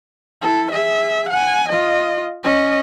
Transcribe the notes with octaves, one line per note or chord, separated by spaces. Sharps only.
E4 A4
G#4 E5
F#5 G#5
F4 D#5
C#4 D#5